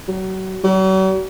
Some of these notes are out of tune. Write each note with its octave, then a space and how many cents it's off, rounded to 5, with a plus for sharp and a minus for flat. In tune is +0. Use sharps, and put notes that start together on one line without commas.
F#3 +35
F#3 +45